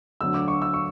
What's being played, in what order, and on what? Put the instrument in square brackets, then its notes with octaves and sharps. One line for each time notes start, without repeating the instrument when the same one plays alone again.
[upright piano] D2 D3 F#3 E6
D6
C#6
E6
C#6